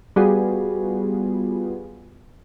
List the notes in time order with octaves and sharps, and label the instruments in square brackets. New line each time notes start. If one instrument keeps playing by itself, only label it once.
[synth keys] G3 B3 F4 F#4 G#4